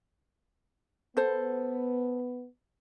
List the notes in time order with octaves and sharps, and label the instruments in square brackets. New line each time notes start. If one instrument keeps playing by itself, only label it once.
[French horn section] B3 [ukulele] A4 C5